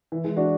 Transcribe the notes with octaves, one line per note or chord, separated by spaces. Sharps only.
E3
E3 G#3
D4 F#4